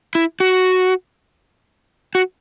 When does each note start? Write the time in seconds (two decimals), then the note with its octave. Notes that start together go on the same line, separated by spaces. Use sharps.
0.15 E4
0.40 F#4
2.15 F#4